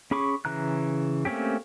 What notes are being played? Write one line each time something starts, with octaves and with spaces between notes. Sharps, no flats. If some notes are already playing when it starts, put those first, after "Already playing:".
C#4 G#4 B5 C#6 D6
C#3 E3 A#5 F#6
A3 A#3 C4 C#4 G4